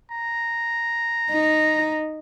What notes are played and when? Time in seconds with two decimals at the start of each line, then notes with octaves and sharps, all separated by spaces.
0.11 A#5
1.31 D#4